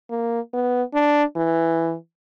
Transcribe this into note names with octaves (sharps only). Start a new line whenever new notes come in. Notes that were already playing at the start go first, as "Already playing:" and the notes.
A#3
B3
D4
E3